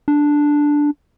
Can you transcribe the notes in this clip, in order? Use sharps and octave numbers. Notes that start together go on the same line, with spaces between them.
D4